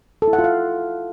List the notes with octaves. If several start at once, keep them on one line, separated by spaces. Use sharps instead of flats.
A4
E4
F#5
F4
F5